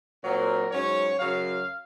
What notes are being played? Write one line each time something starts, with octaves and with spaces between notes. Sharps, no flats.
A#2 F#3 C4 D#4 A#4
G#2 F#3 C#4 C#5
F#2 C#3 F#3 F5